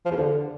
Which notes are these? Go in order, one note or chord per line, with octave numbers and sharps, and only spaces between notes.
F3
E2
D3